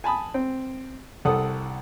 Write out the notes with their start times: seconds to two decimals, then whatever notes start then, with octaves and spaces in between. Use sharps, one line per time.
0.04 G#5 A5 B5 D#6
0.34 C4
1.25 C2 A4 F#5 D#6